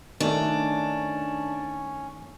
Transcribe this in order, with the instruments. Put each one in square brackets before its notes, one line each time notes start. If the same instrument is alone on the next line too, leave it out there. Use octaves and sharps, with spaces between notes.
[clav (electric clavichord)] D#3 A3 [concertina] C#4 [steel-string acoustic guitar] D4